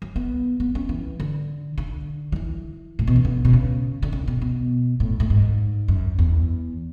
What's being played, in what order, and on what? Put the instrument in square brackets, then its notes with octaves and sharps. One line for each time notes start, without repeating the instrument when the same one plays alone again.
[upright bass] F#3
B3
B3
C#4
E3
D3
D3
F#3
E3
A2
B2
C#3
D3
B2
C#3
D3
C#3
B2
B2
A2
A2
G#2
F#2
E2